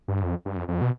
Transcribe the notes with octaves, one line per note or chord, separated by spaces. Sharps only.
G2
F2
G2
F2
F2
B2